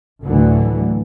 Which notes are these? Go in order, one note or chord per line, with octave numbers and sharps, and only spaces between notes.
D2 A2 D3 E3 F#3 A3